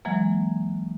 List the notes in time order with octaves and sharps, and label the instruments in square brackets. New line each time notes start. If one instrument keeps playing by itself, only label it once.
[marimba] E3 F#3 G#3 A#3